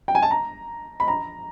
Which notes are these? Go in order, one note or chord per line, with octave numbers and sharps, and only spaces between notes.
G5
G#5
A5
A#5
B5
A#5